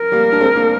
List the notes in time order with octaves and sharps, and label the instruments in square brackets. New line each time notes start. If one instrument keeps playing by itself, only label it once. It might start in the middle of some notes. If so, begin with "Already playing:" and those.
Already playing: [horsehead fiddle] A#4
[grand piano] G3 A#3
D4
G#3 C4
A#3 D4